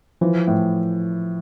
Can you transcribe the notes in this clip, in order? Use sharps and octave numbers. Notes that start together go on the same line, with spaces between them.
E3 F3
A2